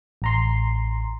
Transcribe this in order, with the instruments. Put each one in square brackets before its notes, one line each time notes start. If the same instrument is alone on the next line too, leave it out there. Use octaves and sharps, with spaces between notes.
[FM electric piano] A1 A#5 C6